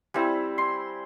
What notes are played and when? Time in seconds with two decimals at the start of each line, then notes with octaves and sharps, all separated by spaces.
0.14 G3 C4 E4 G#5
0.58 C6